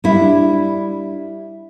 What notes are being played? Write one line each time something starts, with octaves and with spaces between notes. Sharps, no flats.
G3 D4 E4